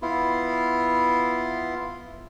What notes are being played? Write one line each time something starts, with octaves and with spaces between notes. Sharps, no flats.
B3 E4 F4